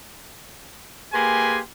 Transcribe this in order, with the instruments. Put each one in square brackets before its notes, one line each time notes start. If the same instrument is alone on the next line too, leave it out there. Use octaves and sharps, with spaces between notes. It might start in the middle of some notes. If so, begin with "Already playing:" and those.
[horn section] A#3 G4 G#4 B4 G#5 C6